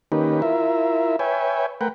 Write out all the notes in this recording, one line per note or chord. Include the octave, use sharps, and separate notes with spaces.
D#3 A#3 C#4 D#4 G4 B4
E4 F4 A#4 E5
B4 C#5 E5 G5 G#5
A3 A#4 B4 F#5 G5